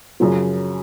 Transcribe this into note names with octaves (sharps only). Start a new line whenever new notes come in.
F#2 C#3 F3